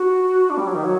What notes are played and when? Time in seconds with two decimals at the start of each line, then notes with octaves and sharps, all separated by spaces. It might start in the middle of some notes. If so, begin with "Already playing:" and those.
Already playing: F#4
0.50 D4
0.57 G3
0.67 F#3
0.74 D#3
0.84 F#3